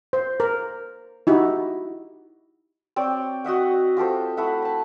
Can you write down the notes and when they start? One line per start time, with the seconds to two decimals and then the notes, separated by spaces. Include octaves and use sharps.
0.13 C5
0.40 A#4
1.27 D#4 E4 F#4 G4
2.96 C4 C#5 D5 G5
3.44 F#4 D#5 E5 F#5
3.74 D#5
3.97 F4 G4 A4 C5
4.37 A3 E4 E5 F#5
4.62 A5 B5